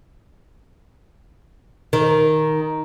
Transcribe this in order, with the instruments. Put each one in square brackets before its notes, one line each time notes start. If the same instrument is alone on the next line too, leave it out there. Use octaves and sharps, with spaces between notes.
[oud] D#3